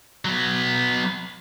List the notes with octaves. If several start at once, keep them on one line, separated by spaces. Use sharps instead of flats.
F#3 B3